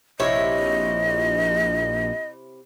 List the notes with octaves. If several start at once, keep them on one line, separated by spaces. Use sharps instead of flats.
A#1 C3 E4 C#5 D#5